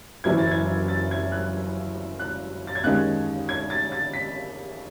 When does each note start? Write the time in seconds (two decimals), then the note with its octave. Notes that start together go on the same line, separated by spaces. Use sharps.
0.24 F#1 F#2 E3 G#6
0.38 A6
0.51 G#6
0.88 A6
1.11 G#6
1.32 F#6
2.19 F#6
2.67 A6
2.75 G#6
2.84 D#2 D#3 G#3 C#4 F#6
3.49 G#6
3.70 A6
3.92 A6
4.14 B6